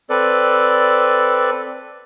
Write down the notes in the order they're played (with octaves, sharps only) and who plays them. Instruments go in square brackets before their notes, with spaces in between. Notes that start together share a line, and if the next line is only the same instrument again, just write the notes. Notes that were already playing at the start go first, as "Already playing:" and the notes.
[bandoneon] C4 A4 B4 D5